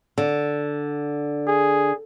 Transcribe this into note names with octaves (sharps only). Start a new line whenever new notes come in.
D3
G#4